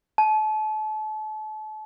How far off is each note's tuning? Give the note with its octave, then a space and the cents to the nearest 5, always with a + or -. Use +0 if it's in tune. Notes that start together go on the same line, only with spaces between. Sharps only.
A5 -35